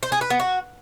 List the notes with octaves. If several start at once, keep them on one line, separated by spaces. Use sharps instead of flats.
C5
G#4
B4
B3
F#4